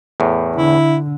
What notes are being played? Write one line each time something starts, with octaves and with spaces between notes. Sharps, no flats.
E2 A2
D3 E4